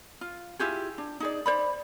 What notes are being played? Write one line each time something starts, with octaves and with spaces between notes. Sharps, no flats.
F4
E4 F4 G4 G#4
D4
D#4 G#4 D5
C5 D5 B5